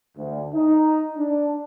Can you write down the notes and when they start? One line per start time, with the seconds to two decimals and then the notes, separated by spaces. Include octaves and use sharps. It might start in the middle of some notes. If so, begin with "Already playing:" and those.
0.17 D2
0.53 D#4
1.17 D4